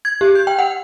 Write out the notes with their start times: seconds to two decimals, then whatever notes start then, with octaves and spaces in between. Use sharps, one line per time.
0.05 G#6
0.21 G4
0.35 G6
0.47 G5
0.59 F#5